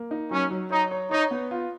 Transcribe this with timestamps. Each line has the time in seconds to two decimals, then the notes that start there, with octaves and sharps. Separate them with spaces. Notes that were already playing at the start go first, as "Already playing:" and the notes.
Already playing: A#3
0.11 D#4
0.31 F#3 C#4
0.51 F#3
0.71 D#4 C#5
0.91 C#5
1.11 D#4 C#5
1.31 B3
1.51 F4